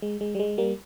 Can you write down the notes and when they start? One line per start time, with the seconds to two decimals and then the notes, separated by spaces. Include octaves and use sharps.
0.02 G#3
0.21 G#3
0.35 G3
0.39 G#3
0.58 G3 A#3